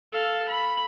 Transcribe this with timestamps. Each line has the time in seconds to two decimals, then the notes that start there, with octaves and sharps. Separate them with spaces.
0.12 A4 F5
0.49 B5